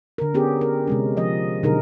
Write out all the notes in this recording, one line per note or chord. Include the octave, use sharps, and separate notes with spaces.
D3 A#4
B3 C#4 G4 G#4
A#4
C3 G#3 C#4
F3 D#5
B2 D3 F#3 D#4 G#4 A#4